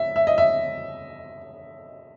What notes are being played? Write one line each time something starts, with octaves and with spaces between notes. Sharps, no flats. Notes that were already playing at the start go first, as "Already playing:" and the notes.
Already playing: E5
E5
D#5
E5